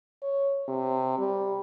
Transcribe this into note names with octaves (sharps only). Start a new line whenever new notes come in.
C#5
C3
G3